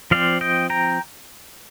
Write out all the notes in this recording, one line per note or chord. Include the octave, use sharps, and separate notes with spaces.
F3 C4 D5 F5
D#5 G5
G5 A#5